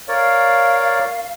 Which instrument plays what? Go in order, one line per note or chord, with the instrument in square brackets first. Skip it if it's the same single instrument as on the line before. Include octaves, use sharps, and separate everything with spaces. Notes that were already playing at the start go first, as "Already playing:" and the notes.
[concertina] A#4 C#5 D5 [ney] F5